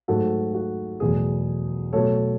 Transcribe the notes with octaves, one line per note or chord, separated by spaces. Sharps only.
G#2 F#3 A3 F#4 A4
F#4
E2 B2 F#3 A3 G#4
B2 F#3 A3 A4 C#5